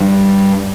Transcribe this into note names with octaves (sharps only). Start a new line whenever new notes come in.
G2